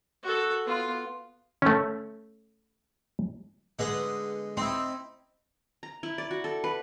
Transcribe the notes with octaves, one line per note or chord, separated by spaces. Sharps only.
F#4 A4
B3 F4
A3 C#4
D3 G#3 B3 G#4 B4 D#5
C4 D#4 E4 C6 E6
A#5
E4
D5
F#4
A4
B4